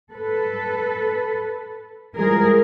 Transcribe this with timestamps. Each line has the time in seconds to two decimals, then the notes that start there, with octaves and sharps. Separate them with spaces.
0.13 A4 B4
2.15 E3 F3 G3 G#3 G#4 A#4